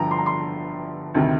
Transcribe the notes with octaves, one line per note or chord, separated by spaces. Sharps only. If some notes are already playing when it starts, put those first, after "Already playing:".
Already playing: G1 G2 D3 F3 G5 A#5
C6
A#5
C6
D2 C3 D#3